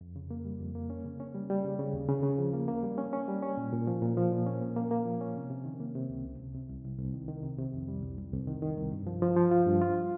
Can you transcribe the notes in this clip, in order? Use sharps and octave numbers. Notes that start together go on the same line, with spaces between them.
F2
C#3
A#3
G3
F2
A#3
C#4
C#3
C#4
G3
G3
C#3
C#3
D#2
C#3
C#3
F3
A#3
A#3
G3
C#4
C#4
G3
C#4
A#2
A#2
F3
A#2
F3
A#2
C#4
A#3
A#3
A#3
F3
C#4
C3
C3
D#3
A#3
C3
C#2
C2
C3
C3
C2
C2
C2
D#3
D#3
C3
C3
F2
G3
C2
C2
C2
D#3
D#3
C2
G2
F3
F3
F3
F4
G2
F4